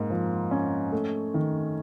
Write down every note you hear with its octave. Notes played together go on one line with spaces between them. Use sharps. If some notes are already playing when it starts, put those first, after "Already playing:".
Already playing: G#2 A#3
F3
C#4
A3
D#3